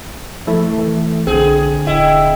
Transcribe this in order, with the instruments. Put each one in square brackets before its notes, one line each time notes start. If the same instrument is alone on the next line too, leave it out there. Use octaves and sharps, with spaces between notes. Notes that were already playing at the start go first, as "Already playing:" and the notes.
[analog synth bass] F3 [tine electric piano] A3 E4 A4
[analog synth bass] E3
[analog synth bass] B1 [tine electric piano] D3 C4 [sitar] G#4
[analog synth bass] D#1 [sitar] E4 [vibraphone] D#5 G5